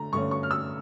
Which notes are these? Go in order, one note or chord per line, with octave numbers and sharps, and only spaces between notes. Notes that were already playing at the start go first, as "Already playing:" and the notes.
Already playing: D3 A3 A#5
G2 D3 A3 C#4 C#6
C#6
F6
E6